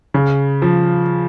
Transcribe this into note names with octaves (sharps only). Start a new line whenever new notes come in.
C#3
F3